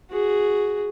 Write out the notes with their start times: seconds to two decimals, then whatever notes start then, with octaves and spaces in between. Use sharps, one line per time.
0.10 F#4 G#4